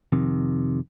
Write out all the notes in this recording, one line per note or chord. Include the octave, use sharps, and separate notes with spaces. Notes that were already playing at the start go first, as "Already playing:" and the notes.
F2 C3 D#3